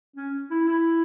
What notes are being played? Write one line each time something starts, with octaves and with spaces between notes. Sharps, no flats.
C#4
E4
E4